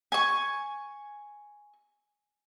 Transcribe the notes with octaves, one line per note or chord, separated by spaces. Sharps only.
G#5 C#6